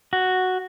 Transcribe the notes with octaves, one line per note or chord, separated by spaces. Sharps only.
F#4